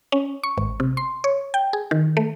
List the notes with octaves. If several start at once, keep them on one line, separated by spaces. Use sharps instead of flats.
C#4
C#6
G#1
C3
C6
C#5
G5
G#4
D#3
A3